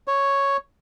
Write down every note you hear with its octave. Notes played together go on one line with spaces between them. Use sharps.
C#5